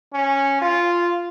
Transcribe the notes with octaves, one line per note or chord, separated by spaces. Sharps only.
C#4
F4